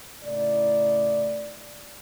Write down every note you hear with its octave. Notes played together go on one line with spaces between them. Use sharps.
A2 C#3 D#4 E4 D5